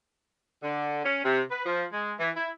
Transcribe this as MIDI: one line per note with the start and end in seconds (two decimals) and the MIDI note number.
0.63 1.03 50
1.03 1.20 61
1.24 1.41 48
1.50 1.63 71
1.66 1.84 53
1.92 2.11 56
2.20 2.29 52
2.35 2.49 64